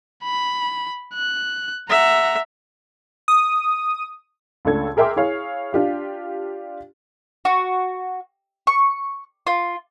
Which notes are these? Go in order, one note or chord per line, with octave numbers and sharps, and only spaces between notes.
B5
F#6
E5 F#5 A#5
D#6
C#2 A3 D4 A4 G#6
G#4 A#4 E5 G5 C6 D6
E4 G#4 C#5 F5
D4 F4 G4 F5
F#4
C#6
F4